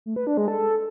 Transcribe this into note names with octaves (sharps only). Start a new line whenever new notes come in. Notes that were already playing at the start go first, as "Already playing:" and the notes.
A3
B4
D4
G#3
A4